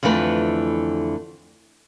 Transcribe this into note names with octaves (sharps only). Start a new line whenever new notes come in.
F2 D3 E3 A3 B4